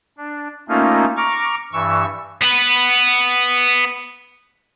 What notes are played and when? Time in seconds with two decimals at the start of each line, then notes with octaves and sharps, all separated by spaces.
0.18 D4
0.68 A3 A#3 C#4 D#4 F4
1.17 A#5 C#6 D6 F6
1.73 G2 E3 C#6 E6
2.42 B3 B4